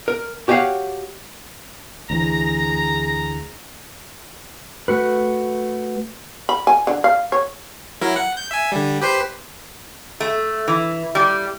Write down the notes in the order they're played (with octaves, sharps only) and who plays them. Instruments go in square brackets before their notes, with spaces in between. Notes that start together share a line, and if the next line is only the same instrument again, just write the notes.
[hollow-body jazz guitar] A#4
F#4 G4 C#5 D#5 F5 F#5
[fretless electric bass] D2 E3 [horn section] G#4 A#5
[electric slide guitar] A3 F#4 B4
[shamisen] B5
G#5
D3
F5
C#5
[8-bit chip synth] F#3 E4 A#4
F#5
G6
E5 G#5
D3 G3
G4 B4 C5
[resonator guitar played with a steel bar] A3
E3
G3